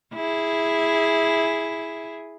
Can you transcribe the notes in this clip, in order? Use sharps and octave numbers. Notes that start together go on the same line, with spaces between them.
E4 G#4